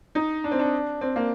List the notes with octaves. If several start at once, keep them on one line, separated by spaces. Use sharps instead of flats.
D#4
D4
C4
D4
C4
A#3